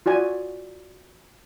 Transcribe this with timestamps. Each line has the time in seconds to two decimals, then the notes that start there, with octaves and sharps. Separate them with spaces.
0.06 F4 F#4 D5 G#5